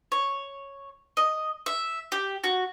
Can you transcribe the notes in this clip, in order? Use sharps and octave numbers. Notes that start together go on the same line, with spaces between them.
C#5
D#5
E5
G4
F#4